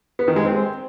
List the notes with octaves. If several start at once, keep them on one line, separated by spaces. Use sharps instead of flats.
B3
D#3
G#3
C4